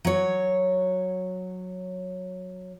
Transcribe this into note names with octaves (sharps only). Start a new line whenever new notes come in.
F#3 C#5